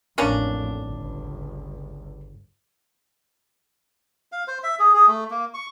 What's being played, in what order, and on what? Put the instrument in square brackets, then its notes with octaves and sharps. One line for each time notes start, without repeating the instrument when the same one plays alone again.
[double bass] A1 F2 [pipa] A#3 C#4 D4
[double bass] G1 C#2
[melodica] F5
C5
E5
G#4
G#4
A3
A#3
C#6